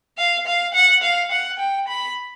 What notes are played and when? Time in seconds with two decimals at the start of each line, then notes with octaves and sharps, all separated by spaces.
0.18 F5
0.47 F5
0.74 F#5
1.03 F5
1.31 F#5
1.59 G5
1.88 B5